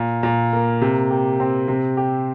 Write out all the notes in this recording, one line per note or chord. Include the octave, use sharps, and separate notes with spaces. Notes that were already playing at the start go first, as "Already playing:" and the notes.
Already playing: A#2
A#2
A#3
C3
G4
C4
C3
G4